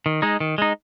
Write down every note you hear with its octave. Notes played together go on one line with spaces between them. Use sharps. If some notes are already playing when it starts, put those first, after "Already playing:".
D#3
G#3 D#4
D#3
G#3 D#4